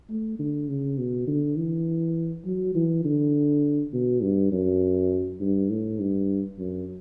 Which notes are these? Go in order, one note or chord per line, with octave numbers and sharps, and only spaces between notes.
A3
D3
C#3
B2
D3
E3
F#3
E3
D3
B2
G2
F#2
G2
A2
G2
F#2